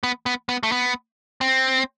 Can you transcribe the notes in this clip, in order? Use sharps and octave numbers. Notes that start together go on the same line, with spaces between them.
B3
B3
B3
A3
B3
C4